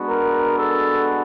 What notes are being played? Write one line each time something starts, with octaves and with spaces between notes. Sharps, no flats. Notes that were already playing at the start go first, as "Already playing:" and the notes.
Already playing: G#3 B3 D4 F#4
A#4
A4